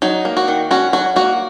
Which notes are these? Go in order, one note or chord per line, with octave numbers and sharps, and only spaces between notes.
F#3 D#4
A#3
F#4
D#3
C#4 F#4
F#3 F#4
A#3 F#4